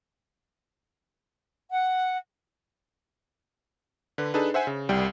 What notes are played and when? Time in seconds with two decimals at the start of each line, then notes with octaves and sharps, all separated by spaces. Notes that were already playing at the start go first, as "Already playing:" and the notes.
1.71 F#5
4.18 D3 B4
4.34 D4 D#4 G#4 A4 B4
4.54 C5 E5 F#5 G#5
4.67 C#3
4.89 C2 G3 G5